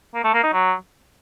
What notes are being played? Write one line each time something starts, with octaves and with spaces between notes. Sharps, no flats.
A#3
A3
A#3
D#4
F#3